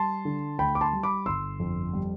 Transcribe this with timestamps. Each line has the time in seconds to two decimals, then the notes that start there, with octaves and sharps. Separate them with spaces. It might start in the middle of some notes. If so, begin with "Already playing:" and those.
Already playing: G3 A5 C6
0.25 D3
0.58 D2 G5 B5
0.75 D6
0.81 A5 C6
0.93 G3
1.03 B5 D6
1.26 G1 C6 E6
1.60 F2
1.93 G3